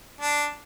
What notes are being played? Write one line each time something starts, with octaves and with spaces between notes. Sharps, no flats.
D4